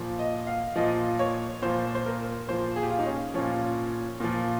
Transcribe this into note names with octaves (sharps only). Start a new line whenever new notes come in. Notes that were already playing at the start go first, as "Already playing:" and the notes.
Already playing: A#2 F3
D#5
F5
A#2 F3 D#5
C#5
A#2 F3 C5
C5
A#4
A#2 F3 C5
G#4
G4
F4
D#4
C#4
A#2 F3 C#4
A#2 F3